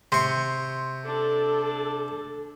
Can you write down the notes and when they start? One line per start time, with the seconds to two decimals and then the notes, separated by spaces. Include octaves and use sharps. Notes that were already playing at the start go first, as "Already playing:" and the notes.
0.12 C3 C6 C#6
1.05 D4 A4